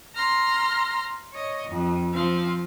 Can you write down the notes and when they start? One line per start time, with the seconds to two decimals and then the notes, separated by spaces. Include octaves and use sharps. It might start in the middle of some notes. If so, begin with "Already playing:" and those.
0.15 A#5 C6 F6
1.33 C#5 D#5
1.69 F2
2.13 F3 C4 F5